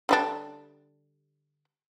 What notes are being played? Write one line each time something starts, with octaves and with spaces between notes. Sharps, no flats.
D3 G3 D4